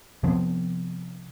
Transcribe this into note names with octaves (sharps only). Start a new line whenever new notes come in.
C3 F3 B3 C4